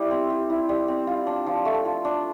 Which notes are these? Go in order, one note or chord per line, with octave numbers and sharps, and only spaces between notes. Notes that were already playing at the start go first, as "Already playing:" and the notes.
Already playing: G3 E4 G4
C4
G4
E4
G3
C4
F4
D4
F3
A3
F4
D4